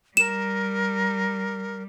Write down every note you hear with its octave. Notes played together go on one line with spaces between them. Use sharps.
G3 A#4 E7